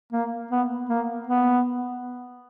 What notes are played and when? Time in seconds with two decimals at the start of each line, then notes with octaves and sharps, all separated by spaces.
0.13 A#3
0.51 B3
0.89 A#3
1.27 B3